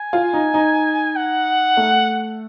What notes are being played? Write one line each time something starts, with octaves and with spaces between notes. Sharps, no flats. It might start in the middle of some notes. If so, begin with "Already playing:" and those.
Already playing: G#5
F4
D#4
D#4
F#5
A3